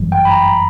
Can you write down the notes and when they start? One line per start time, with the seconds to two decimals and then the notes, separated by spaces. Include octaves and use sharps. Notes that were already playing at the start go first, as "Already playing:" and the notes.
Already playing: G1 F#2 E3 G3
0.12 G5
0.25 B5
0.31 A#5